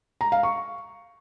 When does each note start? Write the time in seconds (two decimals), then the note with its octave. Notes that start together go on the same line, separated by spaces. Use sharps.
0.21 A#5
0.32 F5
0.43 C#6